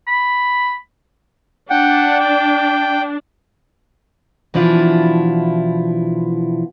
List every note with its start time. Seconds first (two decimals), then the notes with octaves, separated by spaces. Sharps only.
0.08 B5
1.70 D4 F#5 G5
2.20 G5
4.54 B2 E3 F3 D4 E4 F4